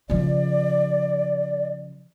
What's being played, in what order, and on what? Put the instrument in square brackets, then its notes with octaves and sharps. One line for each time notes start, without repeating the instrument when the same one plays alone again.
[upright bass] C#3 F3 [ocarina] D5